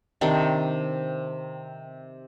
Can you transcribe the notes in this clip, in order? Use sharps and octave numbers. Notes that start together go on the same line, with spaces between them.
C3 D#3 C4 D4